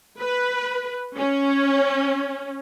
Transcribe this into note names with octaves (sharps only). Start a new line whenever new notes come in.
B4
C#4